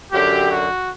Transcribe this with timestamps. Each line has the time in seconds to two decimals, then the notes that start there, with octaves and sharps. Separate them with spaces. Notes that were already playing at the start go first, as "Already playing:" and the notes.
0.11 F#2 D3 F#3 G4
0.50 F#4